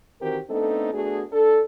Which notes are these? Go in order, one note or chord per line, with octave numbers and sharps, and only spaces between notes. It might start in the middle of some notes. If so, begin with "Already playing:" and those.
D#3 E3 C4 F#4 G4 A#4
A3 B3 C4 D4 D#4 A4
A3 B3 D4 F#4 G#4
D4 A4